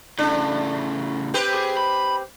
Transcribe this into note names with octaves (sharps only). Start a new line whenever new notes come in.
A2 C#3 D4
C4 G4 B4
G#4
B5